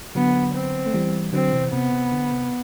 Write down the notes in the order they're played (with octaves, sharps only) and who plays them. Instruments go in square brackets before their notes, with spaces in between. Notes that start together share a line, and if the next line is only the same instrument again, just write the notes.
[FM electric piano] D3 F#3 [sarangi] B3
[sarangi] C4
[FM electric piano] A3
E3 G3
[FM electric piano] D3 F#3 [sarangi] C4
[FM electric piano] C3 E3
[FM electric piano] C3 [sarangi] B3
[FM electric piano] C3
D3
C3